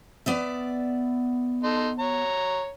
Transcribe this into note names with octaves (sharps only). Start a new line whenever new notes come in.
B3 D5 E5
D#4 A4 C6
C#5 A#5